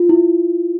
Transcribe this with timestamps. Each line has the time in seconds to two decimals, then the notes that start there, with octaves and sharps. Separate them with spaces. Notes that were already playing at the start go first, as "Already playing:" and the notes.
Already playing: F4
0.09 E4